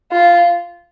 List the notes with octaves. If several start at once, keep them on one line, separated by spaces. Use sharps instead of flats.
F4